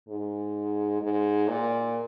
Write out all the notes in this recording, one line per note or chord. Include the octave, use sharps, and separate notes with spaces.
G#2
G#2
A#2